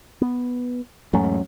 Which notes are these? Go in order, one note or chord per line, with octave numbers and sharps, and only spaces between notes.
B3
E2 G#2 F#3 A3 C#4